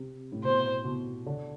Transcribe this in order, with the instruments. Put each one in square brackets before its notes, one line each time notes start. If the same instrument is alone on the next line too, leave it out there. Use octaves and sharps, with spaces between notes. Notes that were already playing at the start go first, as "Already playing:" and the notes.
Already playing: [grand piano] C3
A2
[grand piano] B2 [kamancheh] C5
[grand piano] B2
D3